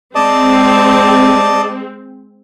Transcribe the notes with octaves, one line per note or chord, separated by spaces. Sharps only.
G#3 C4 D5 D#5 A5